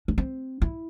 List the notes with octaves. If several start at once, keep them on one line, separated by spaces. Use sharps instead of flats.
D4
C4
E4